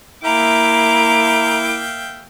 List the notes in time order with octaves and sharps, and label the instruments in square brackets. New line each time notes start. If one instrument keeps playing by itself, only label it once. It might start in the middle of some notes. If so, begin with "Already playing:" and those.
[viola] A#3 D6 [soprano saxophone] E4 [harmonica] E5 F5 G5 [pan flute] A#5